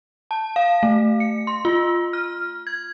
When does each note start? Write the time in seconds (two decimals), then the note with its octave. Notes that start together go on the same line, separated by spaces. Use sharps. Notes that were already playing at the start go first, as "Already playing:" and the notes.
0.31 A5
0.56 F5
0.83 A3
1.20 C#7
1.47 C6
1.65 F4
2.13 F6
2.67 G#6